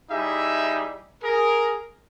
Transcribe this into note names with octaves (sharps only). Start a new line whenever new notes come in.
G3 D#4 E4 G4 G#4 E5
G#4 A#4